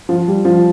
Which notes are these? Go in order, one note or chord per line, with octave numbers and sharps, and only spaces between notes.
F3
G3
F3